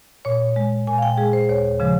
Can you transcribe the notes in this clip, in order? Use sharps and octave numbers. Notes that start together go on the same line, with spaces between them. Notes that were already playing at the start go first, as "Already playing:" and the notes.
A#2 C#5
G#3
A#2 G#5
F5
G5
G#3 G#4
C5
D#2 C#5
C#3 F3 G#3